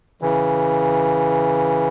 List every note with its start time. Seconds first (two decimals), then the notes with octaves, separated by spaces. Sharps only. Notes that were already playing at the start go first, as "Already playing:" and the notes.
0.22 C#3 E3